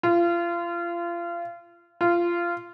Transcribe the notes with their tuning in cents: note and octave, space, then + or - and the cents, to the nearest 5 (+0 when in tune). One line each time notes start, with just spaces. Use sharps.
F4 -30
F4 -20